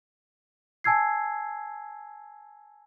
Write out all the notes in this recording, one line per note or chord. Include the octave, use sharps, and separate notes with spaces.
G#5 A5 E6 G#6 C7